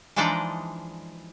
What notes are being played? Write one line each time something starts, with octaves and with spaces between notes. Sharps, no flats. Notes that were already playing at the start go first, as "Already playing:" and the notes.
E3 F3 G#3 D4 D#4 D5